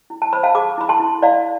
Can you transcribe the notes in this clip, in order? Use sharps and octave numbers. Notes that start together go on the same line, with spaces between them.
E4
A5
C5 B5
F5 A5
G#4 B5 D6
E4 B5
A5 C6
E4
E4 D5 F5